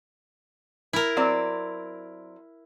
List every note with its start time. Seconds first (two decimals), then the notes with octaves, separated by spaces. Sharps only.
0.93 E4 A#4
1.17 F#3 C4 D5